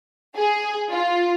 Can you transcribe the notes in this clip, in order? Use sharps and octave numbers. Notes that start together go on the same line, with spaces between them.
G#4
F4